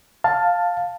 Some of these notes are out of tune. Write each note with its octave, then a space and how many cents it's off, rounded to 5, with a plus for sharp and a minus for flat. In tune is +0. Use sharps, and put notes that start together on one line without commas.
F5 +10 A5 +5